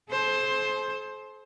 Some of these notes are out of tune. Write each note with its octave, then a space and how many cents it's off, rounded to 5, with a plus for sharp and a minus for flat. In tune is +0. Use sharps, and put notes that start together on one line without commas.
A4 -45 C5 +10